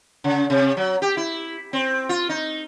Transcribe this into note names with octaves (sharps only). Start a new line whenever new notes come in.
C#3
C3
F#3
G4
E4
C4
F4
D#4